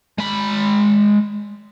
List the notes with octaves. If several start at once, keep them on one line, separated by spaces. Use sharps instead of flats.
G#3 B5